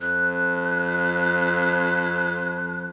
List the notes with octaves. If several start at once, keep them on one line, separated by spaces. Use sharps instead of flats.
F2 F#6